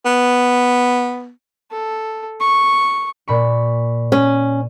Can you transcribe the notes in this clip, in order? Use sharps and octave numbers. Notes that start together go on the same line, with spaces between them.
B3
A4
C#6
A#2 B5 C#6
C#4